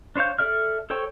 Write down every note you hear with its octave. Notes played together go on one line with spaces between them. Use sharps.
D4 C5 C#5 F5 G6
A4 D5 E5 F6
A4 C5 C#5 G5 C#6